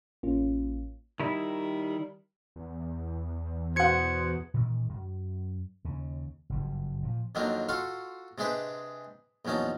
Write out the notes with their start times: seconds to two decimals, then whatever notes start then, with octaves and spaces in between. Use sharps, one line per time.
0.23 A1 A#3 C#4 F4
1.20 D#3 G3 E4
2.56 E2
3.76 B2 C5 F#5 G#6 C#7
4.54 A#2 D#3 E3 G#3
4.89 F#2
5.84 D#2 C#3
6.50 F#1 G2 F3
7.03 A#2 F3
7.35 F2 D#3 F#3 A#3 C4 D4
7.69 F4 F#4 A4 F5 C6 C#6
8.38 C3 G#3 D4 G#4 B4 C5
9.45 A#1 E2 F#3 C#4 D#4 A5